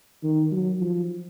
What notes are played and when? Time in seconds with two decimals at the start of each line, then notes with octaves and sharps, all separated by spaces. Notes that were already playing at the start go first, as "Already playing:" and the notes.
0.23 D#3
0.52 F#3
0.81 F3